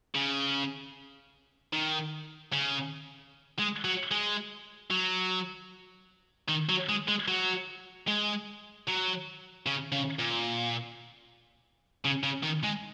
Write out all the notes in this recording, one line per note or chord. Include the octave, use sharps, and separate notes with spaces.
C#3
D#3
C#3
G#3
F#3
G#3
F#3
D#3
F#3
G#3
G#3
F#3
G#3
F#3
C#3
C#3
A#2
C#3
C#3
D#3
G#3